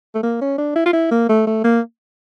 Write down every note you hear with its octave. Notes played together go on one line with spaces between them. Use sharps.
A3
A#3
C#4
D4
E4
F4
E4
A#3
A3
A3
A#3